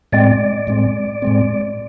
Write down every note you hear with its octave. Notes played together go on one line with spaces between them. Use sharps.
A2 G#3 C4 D5
A2 G#3 C4
A2 G#3 C4